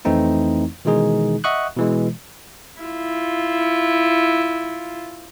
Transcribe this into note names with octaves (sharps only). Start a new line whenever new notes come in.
F2 E3 A3 C4 D#4 E4
B2 D#3 E3 G#3 D#4 G#4
D#5 E5 F#5 C#6 D#6 F#6
B2 E3 G#3
E4 F4